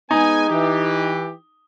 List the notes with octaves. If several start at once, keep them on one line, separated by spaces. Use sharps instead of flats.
G#3 B3 D#4 G#5
E3 G4